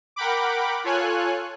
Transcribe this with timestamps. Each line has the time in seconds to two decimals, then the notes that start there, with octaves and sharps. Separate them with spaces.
0.16 A#4 F#5 G5 B5 D6
0.84 F4 A4 C#5 G#5 F#6